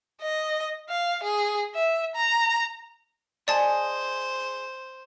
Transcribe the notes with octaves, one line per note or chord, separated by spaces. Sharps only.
D#5
F5
G#4
E5
A#5
G#4 C5 D5 D#5 A5